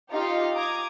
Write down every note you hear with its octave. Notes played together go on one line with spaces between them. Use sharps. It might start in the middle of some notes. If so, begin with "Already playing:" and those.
D#4 F4 G4 D#5 F5
A#5 D6 D#6 G#6